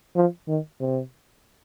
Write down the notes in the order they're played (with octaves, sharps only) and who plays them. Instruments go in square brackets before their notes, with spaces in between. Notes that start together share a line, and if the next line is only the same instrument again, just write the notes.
[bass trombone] F3
D#3
C3